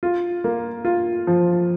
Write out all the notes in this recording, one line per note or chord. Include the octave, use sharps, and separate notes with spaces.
F4
A#3
F4
F3